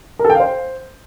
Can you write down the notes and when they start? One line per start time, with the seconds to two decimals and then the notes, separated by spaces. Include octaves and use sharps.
0.19 A#4
0.25 A4
0.30 G5
0.35 F5
0.40 C5